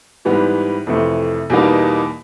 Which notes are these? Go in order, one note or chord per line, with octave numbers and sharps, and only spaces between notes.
G#2 E3 G3 B3
F2 C3 E3 A3
E2 B2 G3 A#3 D#4